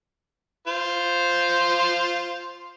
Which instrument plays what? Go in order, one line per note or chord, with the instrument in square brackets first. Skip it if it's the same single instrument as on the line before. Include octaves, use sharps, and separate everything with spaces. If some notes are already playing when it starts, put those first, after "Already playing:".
[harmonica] F4 C5